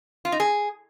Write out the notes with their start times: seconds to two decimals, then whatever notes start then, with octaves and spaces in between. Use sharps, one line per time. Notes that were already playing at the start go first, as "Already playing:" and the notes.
0.25 F4
0.32 D#4
0.40 G#4